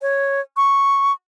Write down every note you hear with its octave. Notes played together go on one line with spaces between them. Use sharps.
C#5
C#6